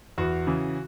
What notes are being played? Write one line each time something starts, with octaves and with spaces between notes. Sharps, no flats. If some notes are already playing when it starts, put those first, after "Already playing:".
E2 F#4
C#3 E3